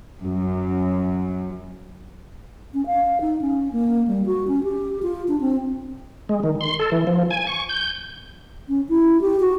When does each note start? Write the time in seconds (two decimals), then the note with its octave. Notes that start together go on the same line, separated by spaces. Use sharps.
0.21 F#2
2.74 C#4
2.86 F5
3.21 D#4
3.41 C#4
3.72 A#3
4.08 G3
4.26 F#4
4.48 C#4
4.63 G4
5.03 F4
5.28 D4
5.41 C4
6.29 G#3
6.43 D#3
6.61 C6
6.79 A4
6.92 E3
7.07 F3
7.30 G#5
7.47 C#6
7.69 G6
8.69 C#4
8.89 E4
9.21 G4
9.40 F#4